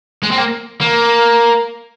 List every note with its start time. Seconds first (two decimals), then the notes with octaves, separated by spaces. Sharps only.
0.23 G#3
0.31 C4
0.38 A#3
0.81 A#3